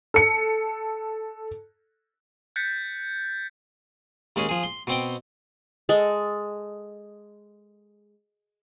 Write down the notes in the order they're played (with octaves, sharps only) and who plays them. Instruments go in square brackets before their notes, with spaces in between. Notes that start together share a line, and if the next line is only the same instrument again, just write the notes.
[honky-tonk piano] A4 C#7
[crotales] F#6 G6 A6 B6 C#7
[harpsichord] D#2 G#3 C#4 G#4
F3 G#4
C6
B2 C4 G5
[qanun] G#3 A4